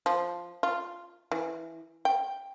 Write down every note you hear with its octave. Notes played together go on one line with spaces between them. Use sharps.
F3
F4
E3
G5